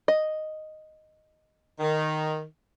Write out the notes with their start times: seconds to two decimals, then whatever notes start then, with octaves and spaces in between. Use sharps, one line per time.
0.08 D#5
1.80 D#3